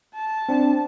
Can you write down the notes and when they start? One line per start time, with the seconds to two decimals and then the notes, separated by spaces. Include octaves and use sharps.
0.15 A5
0.49 C4 D4